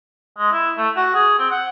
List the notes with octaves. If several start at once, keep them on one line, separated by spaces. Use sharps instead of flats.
G#3
E4
A3
F#4
G#4
C4
F#5